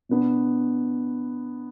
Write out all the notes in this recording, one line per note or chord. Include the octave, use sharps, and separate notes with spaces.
B2 B3 D4